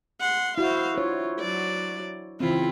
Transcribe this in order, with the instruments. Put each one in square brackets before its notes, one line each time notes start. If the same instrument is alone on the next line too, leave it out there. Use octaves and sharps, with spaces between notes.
[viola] F#5 C6
[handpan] E4 F#4 [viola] C5 F5
[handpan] D4 C5 C#5 [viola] F4
[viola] F#3 D5
[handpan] C#3 E3 C4 [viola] E4 F4